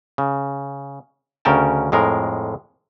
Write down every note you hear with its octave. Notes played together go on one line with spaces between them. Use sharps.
C#3
D2 C#3 C#4 A#4 G5 A5
F2 A2 G#3 A#4